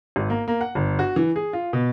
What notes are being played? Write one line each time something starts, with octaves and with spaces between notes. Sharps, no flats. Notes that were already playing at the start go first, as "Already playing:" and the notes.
G#1
A#3
A#3
F#5
G1
F#4
E3
G#4
F4
B2